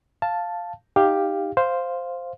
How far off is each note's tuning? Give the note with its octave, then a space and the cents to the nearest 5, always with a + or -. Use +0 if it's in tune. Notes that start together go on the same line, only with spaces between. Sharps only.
F5 +0 A5 +0
D#4 +0 G4 +10 F5 +0
C5 +0 F5 +0